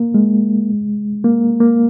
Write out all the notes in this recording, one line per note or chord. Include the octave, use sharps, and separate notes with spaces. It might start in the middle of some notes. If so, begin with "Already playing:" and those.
Already playing: A#3
G#3
A#3
A#3